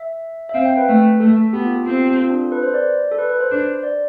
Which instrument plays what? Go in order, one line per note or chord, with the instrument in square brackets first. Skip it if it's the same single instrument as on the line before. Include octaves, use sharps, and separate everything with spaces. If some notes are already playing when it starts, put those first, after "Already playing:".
Already playing: [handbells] E5
E5
[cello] C4 [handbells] F5
[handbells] G5
B4
[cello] A3
[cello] A3 [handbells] A4
[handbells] A4
[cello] B3 [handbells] G4
[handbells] F4
A4
[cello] C4 [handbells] F4
[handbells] G4
A4
G4
F4
D4
A4
B4
C5
D5
A4
B4
B4
C5
[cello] D4
[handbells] D5